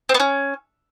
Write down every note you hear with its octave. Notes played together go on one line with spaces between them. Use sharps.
C4
B3
C#4